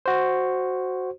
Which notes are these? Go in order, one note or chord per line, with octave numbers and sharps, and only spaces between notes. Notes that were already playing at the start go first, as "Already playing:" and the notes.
F#4 C5